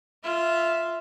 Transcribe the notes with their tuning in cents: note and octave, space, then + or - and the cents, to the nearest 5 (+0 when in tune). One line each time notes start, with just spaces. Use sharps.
F4 -10 E5 +0